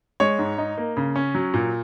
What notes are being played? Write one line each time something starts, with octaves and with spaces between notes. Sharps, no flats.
G#3 C#5
G#2
D#4
A#3
C#3
C#4
F#3
A#2